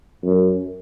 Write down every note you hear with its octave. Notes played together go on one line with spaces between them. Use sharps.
F#2